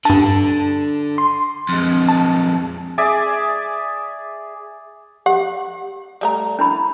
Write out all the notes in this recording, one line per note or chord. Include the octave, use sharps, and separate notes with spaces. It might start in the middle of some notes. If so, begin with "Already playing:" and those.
G2 D3 A5
C6
F2 G#3
A5
G#4 D5 E5 G#5
G4 F#5
G3 A3 A#5
D4 E4 B5